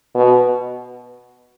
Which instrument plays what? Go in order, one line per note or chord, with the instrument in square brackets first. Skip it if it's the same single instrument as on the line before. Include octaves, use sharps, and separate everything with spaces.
[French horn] B2